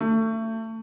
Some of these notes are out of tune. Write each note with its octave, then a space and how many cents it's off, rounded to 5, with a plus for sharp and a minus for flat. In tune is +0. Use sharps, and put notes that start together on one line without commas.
A3 +25